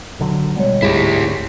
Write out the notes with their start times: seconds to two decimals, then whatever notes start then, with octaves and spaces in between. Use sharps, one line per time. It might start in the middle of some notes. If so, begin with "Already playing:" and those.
0.19 A#1 D3 F#3
0.56 B2 G3 G#3 C#5
0.82 D1 D2 G#2 E4 G4 G#4